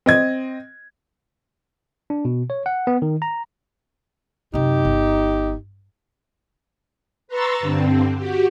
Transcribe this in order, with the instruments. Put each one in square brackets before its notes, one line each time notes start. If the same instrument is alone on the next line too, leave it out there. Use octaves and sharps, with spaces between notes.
[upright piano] C4 D#5 G#6
[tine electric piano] D4
B2
C#5
F#5
B3
D#3
A#5
[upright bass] F#2 C3 [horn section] D#4 G4
[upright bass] G1
[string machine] B4 A#5 C6 C#6 E6 A6
G2 D3 C4
F#4 G4